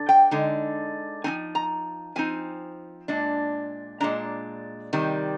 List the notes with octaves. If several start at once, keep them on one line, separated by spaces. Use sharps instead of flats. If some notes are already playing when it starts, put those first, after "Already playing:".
Already playing: D3
G5
D3 G#3 D#4
F3 C4 D#4 G#5
A#5
F3 C4 D#4 G#5
A#2 G#3 D4
A#2 G#3 D4 A#5
C3 D#3 G3